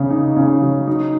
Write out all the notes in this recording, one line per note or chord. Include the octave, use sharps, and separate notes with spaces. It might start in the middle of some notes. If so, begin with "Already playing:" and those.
Already playing: C#3 A#3
D#4
C#3
F#3
D#4